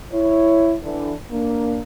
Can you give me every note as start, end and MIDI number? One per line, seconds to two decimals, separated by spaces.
0.12 0.75 64
0.12 0.75 73
0.83 1.12 50
0.83 1.12 52
1.30 1.78 58
1.30 1.78 62